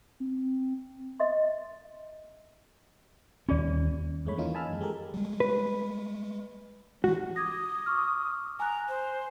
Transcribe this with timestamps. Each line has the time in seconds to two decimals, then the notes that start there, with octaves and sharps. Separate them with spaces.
0.20 C4
1.20 D#5 E5 C6
3.49 D#2 C#4 F4 G#4 D5
4.25 E2 G2 G#3 A3 C#5 B5
4.38 D#3 E3 A#3 C#4 D#4 F4
4.54 D#5 G#5 A5 B5 E6 F6
4.68 F#2 G#3
4.81 G#3 G4 A4 A#4
5.14 G3 G#3
5.40 B4
7.04 E3 G3 G#3 F#4
7.36 D6 D#6 G#6 A#6
7.86 C#6 D6 F6
8.60 G#5 A#5 F#6
8.89 C5